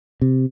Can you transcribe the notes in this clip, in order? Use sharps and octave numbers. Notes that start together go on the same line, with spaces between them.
C3